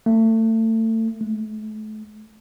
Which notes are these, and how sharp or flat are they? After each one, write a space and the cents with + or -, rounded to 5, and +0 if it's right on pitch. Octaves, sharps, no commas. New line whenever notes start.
A3 +30
A3 -35